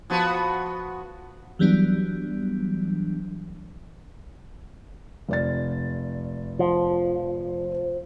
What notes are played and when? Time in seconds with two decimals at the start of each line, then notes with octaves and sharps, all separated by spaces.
0.10 F3 B3 F#4
1.59 E3 F#3 G3 B3 D4
5.29 F1 D5 A6
6.59 F3